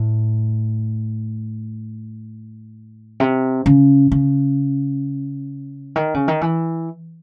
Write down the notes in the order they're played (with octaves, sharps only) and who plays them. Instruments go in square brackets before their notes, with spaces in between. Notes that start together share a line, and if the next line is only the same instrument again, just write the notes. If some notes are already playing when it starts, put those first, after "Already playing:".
Already playing: [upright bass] A2
C3
C#3
C#3
D#3
C#3
D#3
E3